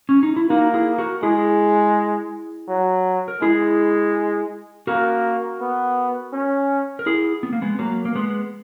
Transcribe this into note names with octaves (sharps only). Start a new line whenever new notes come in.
C#4
D#4
E4
A#3 D#4 F#4
E4 G#4
F#4 A#4
G#3 E4 G#4
F#3
A#4
G#3 E4 G#4
A#3 F#4 A#4
B3
C#4
A#4
E4 G#4
B3
A#3
G#3 B3
F#3 A#3
A#3
G#3 B3